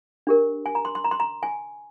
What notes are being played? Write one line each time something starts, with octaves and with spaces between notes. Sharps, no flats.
D4 G4 A#4
G#5
A#5
C6
C6
A#5
C6
A#5
G#5